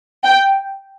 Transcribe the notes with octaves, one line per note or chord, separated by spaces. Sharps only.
G5